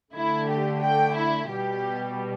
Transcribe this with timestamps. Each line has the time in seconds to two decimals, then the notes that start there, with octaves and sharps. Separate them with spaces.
0.15 D3 A3 E4
0.49 G4
0.82 G5
1.16 E4
1.49 B2 G3 G4